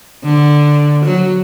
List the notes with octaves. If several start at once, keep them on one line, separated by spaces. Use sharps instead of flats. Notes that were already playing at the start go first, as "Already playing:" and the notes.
D3
F#3